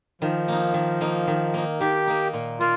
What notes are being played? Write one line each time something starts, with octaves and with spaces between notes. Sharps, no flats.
D#3 F3
A#3 D#4
D#3
A#3 D#4
D#3
A#3 D#4
D#3 G4
A#3 D#4
A#2
A#3 F4